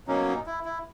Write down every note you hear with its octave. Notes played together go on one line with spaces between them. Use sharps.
B2 F#3 A#3 C#4 D#4
D#4
E4
E4